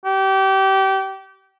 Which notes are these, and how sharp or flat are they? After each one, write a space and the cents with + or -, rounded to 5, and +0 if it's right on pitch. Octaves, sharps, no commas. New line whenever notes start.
G4 -25